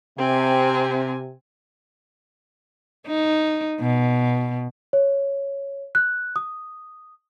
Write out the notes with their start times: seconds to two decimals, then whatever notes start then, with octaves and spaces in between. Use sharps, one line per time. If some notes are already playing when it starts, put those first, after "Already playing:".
0.19 C3 C4 G#5
3.07 D#4
3.80 B2
4.93 C#5
5.95 F#6
6.36 D#6